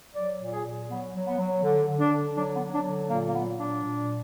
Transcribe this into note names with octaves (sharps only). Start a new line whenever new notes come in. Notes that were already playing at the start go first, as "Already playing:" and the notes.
F#3 D5
A#2
G#4
A#2
F#3 B3
F#3
B3
F#3
D3
D3
D4
D3
F#3 D4
B3
F#3
D4
D3
A#2 A#3
A#3
F#3 B3
A#2 D4
A#2